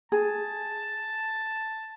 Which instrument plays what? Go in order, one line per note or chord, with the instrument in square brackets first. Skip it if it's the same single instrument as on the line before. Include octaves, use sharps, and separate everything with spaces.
[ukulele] G#4 [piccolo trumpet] A5